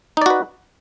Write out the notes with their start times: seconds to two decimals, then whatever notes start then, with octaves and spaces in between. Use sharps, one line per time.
0.17 D#4
0.22 D5
0.26 F#4
0.30 B4